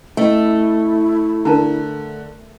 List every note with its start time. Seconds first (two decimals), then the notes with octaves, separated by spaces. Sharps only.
0.17 A3 C#4 E4 D#5
1.45 D3 A#4 A5 A#5